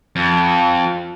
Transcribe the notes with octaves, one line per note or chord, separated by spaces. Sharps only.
F2